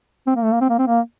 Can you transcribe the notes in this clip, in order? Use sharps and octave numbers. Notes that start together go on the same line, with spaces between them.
C4
A#3
A3
A#3
C4
A#3
C4
A#3